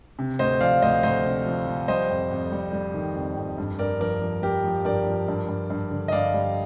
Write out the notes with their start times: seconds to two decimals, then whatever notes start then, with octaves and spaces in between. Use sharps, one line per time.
0.19 C3
0.39 D2 C5 D#5
0.61 F3 D5 F5
0.82 D2 C5 D#5
1.03 D2 C5 D#5
1.25 C3
1.45 F3
1.67 F3
1.88 G3 C5 D#5
2.10 F2
2.31 F2
2.52 G3
2.73 G3
2.94 D#3
3.16 F2
3.37 F2
3.58 G2
3.79 G2 A#4 D5
4.00 F3 A#4 D5
4.22 F3
4.42 F3 G4 A#4
4.64 F3
4.85 G2 A#4 D5
5.07 F3
5.28 G2
5.48 G2
5.70 G2
5.91 D3
6.08 D#5
6.12 G2 D5 F5
6.34 G3